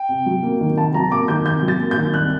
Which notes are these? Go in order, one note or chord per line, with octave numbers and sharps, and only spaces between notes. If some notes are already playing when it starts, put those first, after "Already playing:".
Already playing: G5
C3
F#3
A#3
D#3
C3 A5
F#3 A#5
A#3 D6
D#3 G6
C3 G6
F#3
A6
A#3
G6
D#3
C2 F#6